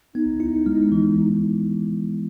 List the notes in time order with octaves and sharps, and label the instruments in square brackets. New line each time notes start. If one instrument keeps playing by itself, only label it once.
[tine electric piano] B3 [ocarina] D#4
[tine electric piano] E4
G#3
E3